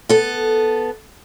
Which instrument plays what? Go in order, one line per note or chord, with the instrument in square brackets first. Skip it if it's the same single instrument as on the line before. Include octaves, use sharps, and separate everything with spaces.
[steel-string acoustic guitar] B3 A4